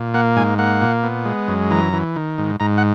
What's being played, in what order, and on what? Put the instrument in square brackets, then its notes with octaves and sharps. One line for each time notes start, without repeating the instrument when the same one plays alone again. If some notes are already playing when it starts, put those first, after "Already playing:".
Already playing: [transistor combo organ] A#2
A#3 F#5
G#2 G#5
A#3 F#5
A#2
B3
G#3
F#2
E3 A#5
E3
D#3
G#2
G#2 A#5
F#5